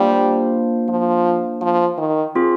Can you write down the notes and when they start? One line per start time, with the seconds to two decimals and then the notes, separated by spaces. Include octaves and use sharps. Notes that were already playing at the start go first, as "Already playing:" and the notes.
Already playing: G3 A#3 D4 F4 C5 F5
0.89 F3
1.62 F3
1.98 D#3
2.35 C4 F4 G#4